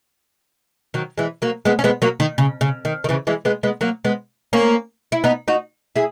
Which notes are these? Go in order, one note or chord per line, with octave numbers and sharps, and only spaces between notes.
D#3 F#3
E3 G#3
F#3 A#3
G#3 B3
C#4
G#3 B3
F#3 A#3
D#3
C#3
C#3
D#3
D#3
C#3 E3
E3 G#3
G#3 B3
G#3 B3
F#3 A#3
G#3 B3
A#3 C#4
E4
B3 D#4
D#4 F#4
E4 G#4